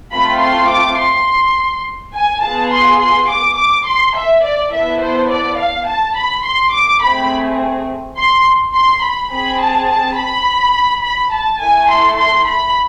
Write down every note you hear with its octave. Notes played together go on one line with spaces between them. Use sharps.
A3 C4 F4 A4 B5
C6
D6
C6
G#5
B3 F4 G#4 A5
C6
C6
D6
D6
C6
E5
D5
B3 E4 A4 E5
C5
D5
F5
A5
B5
C6
D6
A3 C4 G#4 B5
C6
C6
B5
C4 G#4 B5
A5
A5
B5
B5
A5
A3 E4 A4 G#5
C6
C6
B5